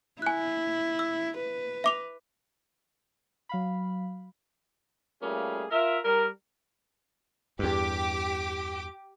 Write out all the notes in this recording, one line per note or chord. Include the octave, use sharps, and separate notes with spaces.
E4 G#5 F#6
E6
B4
E5 D6 F7
F#3 F5 B5
G3 A3 A#3 C#4 F4 G#4
F4 A#4 E5
G3 A#4
E2 G2 G4 D6